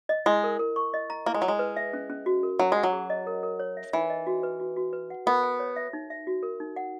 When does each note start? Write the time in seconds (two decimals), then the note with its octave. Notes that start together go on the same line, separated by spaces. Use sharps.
0.09 D#5
0.26 G#3 E4
0.44 A#4
0.59 A#4
0.76 C#6
0.94 D#5
1.10 A#5
1.26 A#3 E4
1.34 G#3
1.42 F#3 G#5
1.48 G#3
1.59 B4
1.77 E5
1.93 C#4
2.10 C#4
2.26 F#4
2.43 A#4
2.59 F#3 C#4
2.72 G#3 F#5
2.83 F#3
2.93 G#4
3.10 D#5
3.27 A#4
3.43 A#4
3.60 C#5
3.77 E5
3.93 E3 D#4
4.10 D#5
4.27 F#4
4.43 B4
4.60 F#4
4.76 F#4
4.93 B4
5.10 F#5
5.26 B3 A#4
5.43 G#5
5.60 C#5
5.76 E5
5.93 D#4
6.10 E5
6.27 F#4
6.43 A#4
6.60 D#4
6.76 F#5